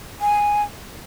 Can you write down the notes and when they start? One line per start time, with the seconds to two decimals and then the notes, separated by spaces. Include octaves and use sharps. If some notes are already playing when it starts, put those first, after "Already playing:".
0.21 G#5